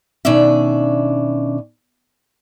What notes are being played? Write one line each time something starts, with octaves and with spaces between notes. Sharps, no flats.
B2 D#3 C#4 D4 D5 E5